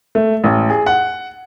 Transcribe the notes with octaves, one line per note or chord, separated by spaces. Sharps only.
A3
A1
G#4
F#5